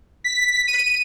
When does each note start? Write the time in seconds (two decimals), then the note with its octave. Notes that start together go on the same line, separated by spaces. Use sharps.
0.24 B6
0.68 D#7